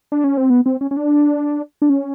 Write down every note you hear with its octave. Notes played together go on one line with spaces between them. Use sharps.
D4
C#4
C4
B3
C4
C#4
C#4
D4
D4
C#4